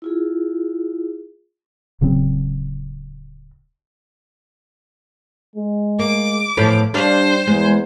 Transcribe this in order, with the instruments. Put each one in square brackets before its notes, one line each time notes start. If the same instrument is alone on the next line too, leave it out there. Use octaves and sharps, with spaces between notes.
[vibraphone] E4 F4 G#4
[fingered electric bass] D1 C#3 F#3 C4
[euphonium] G#3
[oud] A#3 [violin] D6
[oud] E2 A2 F3
[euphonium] G3 [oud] D4 F5 [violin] C5
[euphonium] E2 [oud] G#3